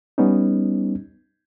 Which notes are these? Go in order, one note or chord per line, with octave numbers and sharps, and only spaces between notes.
G3 B3 C#4 D#4